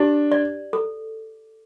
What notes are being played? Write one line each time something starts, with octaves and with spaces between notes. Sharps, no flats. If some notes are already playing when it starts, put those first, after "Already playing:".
Already playing: D4 G4
D5
A4